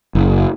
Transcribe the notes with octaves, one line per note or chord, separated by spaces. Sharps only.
F#1